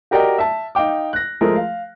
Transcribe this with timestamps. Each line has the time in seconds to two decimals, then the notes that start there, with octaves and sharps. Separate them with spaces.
0.11 F#4 G4 A#4 D5 D#5 G5
0.38 E5 A5
0.75 D#4 F5 G5 D6
1.13 F#6 A#6
1.41 F3 G#3 A3 G#4 A#4
1.56 F5